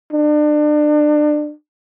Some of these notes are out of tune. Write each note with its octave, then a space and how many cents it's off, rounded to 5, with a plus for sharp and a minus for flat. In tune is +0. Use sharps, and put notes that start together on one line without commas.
D4 +30